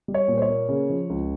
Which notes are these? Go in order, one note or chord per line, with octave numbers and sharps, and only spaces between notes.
G3
C#5
A#2
C5
C#5
A#3
C#3
F3
C#2